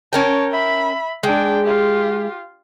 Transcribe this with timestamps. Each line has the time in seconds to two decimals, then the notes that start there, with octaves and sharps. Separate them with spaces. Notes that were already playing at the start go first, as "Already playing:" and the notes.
0.13 C#4 A#4 C#5 G5 A5
0.51 E5 B5
1.23 G#3 D4 G5
1.63 F4 G4